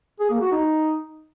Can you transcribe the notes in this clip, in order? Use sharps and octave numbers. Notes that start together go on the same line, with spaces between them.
G#4
A#3
F#4
D#4